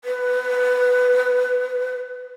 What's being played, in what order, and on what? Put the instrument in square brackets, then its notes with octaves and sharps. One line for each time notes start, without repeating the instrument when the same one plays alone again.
[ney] B4